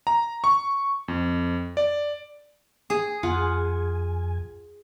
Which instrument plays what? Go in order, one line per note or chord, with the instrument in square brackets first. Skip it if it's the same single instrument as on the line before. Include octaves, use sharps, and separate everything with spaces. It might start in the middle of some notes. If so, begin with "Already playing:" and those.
[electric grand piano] A#5
C#6
F2
D5
[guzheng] G#4
[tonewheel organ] F2 G#5 [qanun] F4 F#5